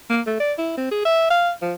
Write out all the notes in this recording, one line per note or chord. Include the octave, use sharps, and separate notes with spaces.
A#3
A3
D5
E4
C4
G#4
E5
F5
F3